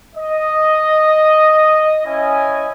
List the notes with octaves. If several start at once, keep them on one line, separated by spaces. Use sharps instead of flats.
D#5
C#4 E4 D#5 G#5